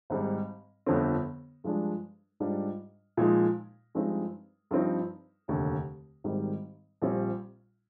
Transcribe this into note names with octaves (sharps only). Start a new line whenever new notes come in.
G#1 G#2 G3
G1 F2 D3 F3 C4
G2 F3 G#3 D4
G#2 G3 D4 F4
A#2 F3 G#3 D#4
G2 F3 G#3 C4 D#4
G2 F3 C4 D#4
F1 D#2 D3
G#1 G#2 D#3 G3
A#1 A#2 G3 C4